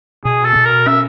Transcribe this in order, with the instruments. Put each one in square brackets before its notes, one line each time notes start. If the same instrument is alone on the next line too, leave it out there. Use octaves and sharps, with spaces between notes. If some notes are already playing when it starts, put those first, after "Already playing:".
[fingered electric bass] B2 [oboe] G#4
[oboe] A4
[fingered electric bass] B2
[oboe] A#4
[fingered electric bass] C#4 [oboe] E5